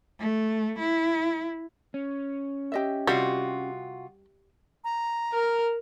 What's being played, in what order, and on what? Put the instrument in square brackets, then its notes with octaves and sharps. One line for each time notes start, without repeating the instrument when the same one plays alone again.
[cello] A3
E4
[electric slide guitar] C#4
[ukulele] G4 D#5 E5
[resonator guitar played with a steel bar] C3 F4 F#4 [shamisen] G3
[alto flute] A#5
[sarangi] A#4